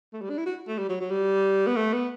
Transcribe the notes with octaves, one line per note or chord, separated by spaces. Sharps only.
A3
G3
D4
E4
F#4
A3
G3
F#3
F#3
G3
B3
A3
B3